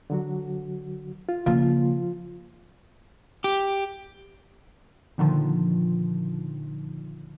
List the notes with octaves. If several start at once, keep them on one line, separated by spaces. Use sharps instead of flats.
D3 F#3 F#4
F4
C#3 F3 A#3 F4
G4
A#2 D3 D#3 F3